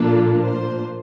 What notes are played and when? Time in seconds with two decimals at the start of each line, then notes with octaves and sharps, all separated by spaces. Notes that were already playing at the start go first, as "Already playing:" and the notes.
Already playing: A#2 F3 A#3 D4 F4 A4
0.43 C5